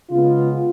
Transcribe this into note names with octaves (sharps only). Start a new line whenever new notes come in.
C#3 G#3 B3 F4